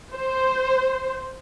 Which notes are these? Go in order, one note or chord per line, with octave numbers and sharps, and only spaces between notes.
C5